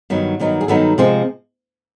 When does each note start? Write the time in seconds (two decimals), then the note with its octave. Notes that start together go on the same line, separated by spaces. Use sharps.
0.10 G2 D#3 F#3 B3 D#4
0.39 G2 D#3 F#3 B3 D#4
0.61 G#4
0.68 G2 D#3 F#3 B3 D#4 A4
0.98 C3 F3 G#3 C4